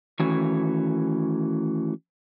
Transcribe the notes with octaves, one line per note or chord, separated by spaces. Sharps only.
D#3 E3 A3 C#4 F#4